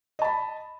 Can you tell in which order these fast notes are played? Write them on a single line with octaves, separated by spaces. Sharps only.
D#5 A5 B5